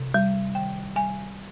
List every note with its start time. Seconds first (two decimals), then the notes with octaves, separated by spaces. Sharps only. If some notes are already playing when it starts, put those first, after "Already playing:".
Already playing: C3
0.14 G3
0.55 D#3 G5
0.96 G3 G#5